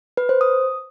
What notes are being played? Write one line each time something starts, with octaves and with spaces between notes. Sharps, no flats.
B4
C5
D#6